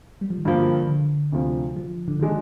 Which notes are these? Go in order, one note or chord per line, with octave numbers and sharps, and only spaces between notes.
G3
F3
D#3
G2 D3 F3 A#3
D3
D2 C3 F3
F3
D3
D3 D#3 G#3 D4